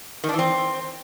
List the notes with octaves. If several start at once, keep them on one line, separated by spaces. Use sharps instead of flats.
D#3
D4
E3
C4